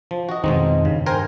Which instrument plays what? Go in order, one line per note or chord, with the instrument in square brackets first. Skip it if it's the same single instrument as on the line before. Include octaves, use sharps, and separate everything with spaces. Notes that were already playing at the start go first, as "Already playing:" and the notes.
[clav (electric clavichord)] F3
F#4 D#5
[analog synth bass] F2 [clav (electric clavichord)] B2 G#3 C4 [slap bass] D#3 [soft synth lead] D#4
[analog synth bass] G2 [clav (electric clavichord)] C#3
[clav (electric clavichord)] A#4 C5 G5 [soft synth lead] G#5